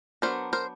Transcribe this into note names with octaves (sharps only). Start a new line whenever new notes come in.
F#3 B3 D4 A#4 C5
A#4 C5